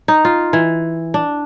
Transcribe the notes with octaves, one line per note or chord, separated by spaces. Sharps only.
D#4
F4
E3
D4